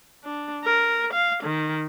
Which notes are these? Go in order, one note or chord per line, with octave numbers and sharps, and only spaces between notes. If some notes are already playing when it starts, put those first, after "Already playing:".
D4
A#4
F5
D#3